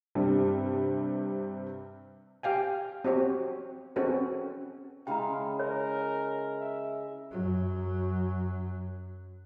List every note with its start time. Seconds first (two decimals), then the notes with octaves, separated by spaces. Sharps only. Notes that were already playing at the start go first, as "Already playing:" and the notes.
0.15 G2 C3 G3
2.43 G4 F5 G5 G#5
3.05 C4 F#4 G4 C#5
3.96 C4 C#4 F#4 G#4 A4 B4
5.07 C#3 G#3 E4 F5 G5 A#5
5.59 A#4 C#5
6.60 E5
7.31 F#2 F#3